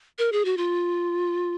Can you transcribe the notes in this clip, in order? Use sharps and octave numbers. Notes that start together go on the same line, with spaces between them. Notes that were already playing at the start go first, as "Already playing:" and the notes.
A#4
G#4
F#4
F4